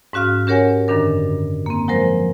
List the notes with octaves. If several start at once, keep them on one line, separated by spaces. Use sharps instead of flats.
G#2 C#4 F#4 F5 F6
C#4 G4 A#4 C#5 F#5 G#5
F#2 D3 D#3 D4 A#4
A#3 C4
F3 F#3 G#3 A#4 C5